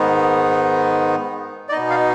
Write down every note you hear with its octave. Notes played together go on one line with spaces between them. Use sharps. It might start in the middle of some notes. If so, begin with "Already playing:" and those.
Already playing: G#2 D#3 B3 D#4
D5
B2 B3 D#4 D#5
F5